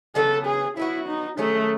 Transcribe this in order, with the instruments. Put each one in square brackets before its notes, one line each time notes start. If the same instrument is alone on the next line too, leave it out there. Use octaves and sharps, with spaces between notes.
[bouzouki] C#3 F#3 B3 [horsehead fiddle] A4
[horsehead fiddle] G#4
[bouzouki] F#3 B3 F#4 [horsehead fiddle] E4
[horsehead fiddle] D#4
[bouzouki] D#3 F#3 C#4 G#4 [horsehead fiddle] A3